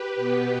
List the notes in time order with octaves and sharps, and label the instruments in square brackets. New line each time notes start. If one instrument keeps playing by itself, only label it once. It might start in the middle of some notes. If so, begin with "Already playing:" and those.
Already playing: [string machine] G4 B4
B2 B3